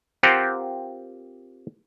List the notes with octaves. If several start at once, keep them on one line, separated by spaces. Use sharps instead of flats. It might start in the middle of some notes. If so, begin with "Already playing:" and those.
C4 F4 G4 A#4 C5 F#5